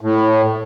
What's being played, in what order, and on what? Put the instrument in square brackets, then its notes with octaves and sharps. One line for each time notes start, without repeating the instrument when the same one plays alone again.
[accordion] A2